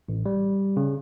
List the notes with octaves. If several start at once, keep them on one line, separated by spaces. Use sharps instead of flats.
A1
G3
C#3